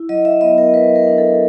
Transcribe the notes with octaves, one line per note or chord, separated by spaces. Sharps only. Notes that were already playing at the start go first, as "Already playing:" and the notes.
Already playing: E4
F#3 D#5
E5
B3 D#5
A#4
F#3 B4
A#4
D4
A4